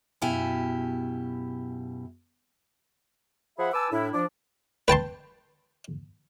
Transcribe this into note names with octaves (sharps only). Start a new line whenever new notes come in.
F#2 B2 E4 G4 F5 G#5
F3 G#4 C5 E5 F#5 B5
B4 G#5 A5 D6 E6
A2 D4 E4
F3 D4
B4 G5 A5 C6